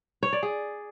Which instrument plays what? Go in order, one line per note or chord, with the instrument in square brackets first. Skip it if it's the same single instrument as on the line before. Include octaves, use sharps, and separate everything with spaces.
[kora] C#5
D5
G#4